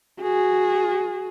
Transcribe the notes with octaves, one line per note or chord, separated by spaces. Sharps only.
F#4 G#4